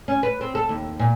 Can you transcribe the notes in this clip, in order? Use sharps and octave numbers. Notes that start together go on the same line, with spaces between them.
C#4
B4
C4
A4
D#2
A#2